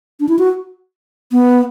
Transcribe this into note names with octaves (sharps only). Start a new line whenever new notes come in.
D4
E4
F#4
B3